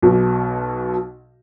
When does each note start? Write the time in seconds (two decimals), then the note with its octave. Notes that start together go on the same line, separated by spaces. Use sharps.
0.02 B1 B2